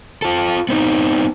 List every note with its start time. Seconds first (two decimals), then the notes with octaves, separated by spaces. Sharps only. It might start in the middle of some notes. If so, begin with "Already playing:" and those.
0.22 F4 A4
0.69 B3 C4 D#4